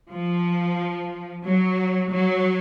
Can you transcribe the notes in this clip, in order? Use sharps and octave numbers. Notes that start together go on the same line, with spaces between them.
F3
F#3
F#3